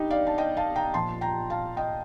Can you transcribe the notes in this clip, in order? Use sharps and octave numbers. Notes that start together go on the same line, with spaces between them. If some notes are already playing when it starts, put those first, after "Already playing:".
Already playing: G2 D#4 G4
D5 F5
A5
D#5 G5
F5 A5
G5 A#5
A#2 F3 A5 C6
G5 A#5
F5 A5
D#5 G5